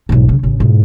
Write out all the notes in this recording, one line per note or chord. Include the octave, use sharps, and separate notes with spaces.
B1 G#2
C#3
A1 C#3
G#2 B2